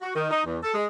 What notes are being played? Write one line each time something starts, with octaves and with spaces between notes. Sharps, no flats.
F#4
D#3
D#4
E2
A4
G#3